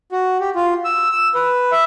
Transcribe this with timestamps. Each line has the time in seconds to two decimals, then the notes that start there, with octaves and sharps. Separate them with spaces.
0.12 F#4
0.40 G4
0.55 F4
0.85 E6
1.11 E6
1.34 B4
1.72 E5